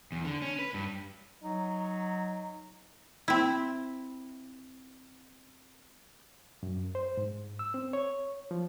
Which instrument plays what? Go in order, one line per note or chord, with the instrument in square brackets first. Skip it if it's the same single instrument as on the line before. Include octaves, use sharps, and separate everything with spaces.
[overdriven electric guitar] E2
D3
C#4
B4
G2
[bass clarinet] F#3 [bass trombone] D#4
[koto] C4 E4
[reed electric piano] F#2
C5
G#2
E6
C4
C#5
F3